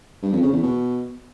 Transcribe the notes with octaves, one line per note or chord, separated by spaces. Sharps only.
G2
F2
C#3
E2
B2